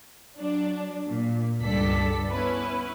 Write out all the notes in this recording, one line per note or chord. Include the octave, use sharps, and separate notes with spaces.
F#3 D4
A#2
C#2 G2 A4 D5 B6
B3 C#4 E4 B4